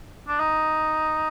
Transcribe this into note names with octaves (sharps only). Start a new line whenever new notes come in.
D4
D#4